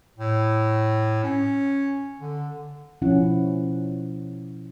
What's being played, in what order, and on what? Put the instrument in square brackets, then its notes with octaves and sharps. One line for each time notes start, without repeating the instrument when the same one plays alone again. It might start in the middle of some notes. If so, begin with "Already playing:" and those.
[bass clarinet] A2
C#4
D3
[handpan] B2 F3 C#4 E4 F#5